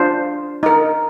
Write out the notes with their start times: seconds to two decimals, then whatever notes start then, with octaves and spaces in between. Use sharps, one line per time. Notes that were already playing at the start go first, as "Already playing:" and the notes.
Already playing: D4 F4 C5
0.63 D#4 A#4